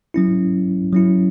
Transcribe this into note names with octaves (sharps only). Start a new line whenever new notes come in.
F#3 C#4 E4
F#3 C#4 E4